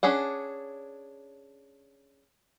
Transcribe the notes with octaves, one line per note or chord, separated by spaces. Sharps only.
C#4 D4 G#4 F#5